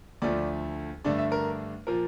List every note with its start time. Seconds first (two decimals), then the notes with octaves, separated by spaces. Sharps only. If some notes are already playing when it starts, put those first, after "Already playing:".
0.22 D2 D3 F3 A3 D5
1.05 G2 D3 A3 D4 D5
1.18 E5
1.32 A#4
1.87 A#2 F3 A#4